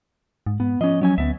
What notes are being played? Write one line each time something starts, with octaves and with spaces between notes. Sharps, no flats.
G#2
G#2 B3
F3 C#4 D#5
F#3 C#4 G#5
D2 B3 E5